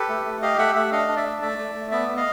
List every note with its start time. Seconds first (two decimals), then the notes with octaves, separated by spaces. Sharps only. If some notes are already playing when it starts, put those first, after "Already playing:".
Already playing: G4 A4 B4
0.09 A3
0.25 A3
0.42 G4 D#5 F5
0.58 A3 E5 F#5
0.75 A3 E5 F#5
0.92 D4 D#5 F5
1.08 D4
1.16 D5 E5
1.26 A3
1.42 A3 D5 E5
1.58 A3
1.75 A3
1.91 B3 D5 E5
2.09 B3
2.17 D#5 F5